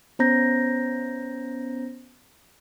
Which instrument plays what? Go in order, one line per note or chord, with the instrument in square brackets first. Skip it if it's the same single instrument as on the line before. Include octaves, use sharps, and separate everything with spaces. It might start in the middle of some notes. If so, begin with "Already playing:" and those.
[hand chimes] B3 C#4 C5 A#5 G6 A#6